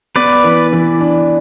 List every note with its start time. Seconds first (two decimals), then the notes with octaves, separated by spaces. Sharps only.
0.16 B3 B4 D5
0.44 E3
0.72 E3
1.01 D4